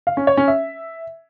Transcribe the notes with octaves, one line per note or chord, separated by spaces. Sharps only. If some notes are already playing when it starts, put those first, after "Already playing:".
F5
C#4
C#5
C#4
E5